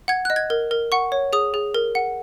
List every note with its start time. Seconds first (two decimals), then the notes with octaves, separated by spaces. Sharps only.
0.08 F#5 G#6
0.25 D#5 F#6
0.36 G#6
0.50 A#4
0.71 A#4
0.92 F#5 C#6
1.12 C#5
1.33 G#4 D#6
1.54 G#4
1.74 A#4
1.95 F#5